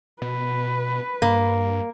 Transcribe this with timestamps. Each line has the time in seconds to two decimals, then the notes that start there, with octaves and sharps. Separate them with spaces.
0.22 B2 B4
1.22 G2 A#3